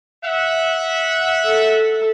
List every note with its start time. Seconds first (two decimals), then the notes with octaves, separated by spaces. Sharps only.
0.24 E5 F#5
1.46 A4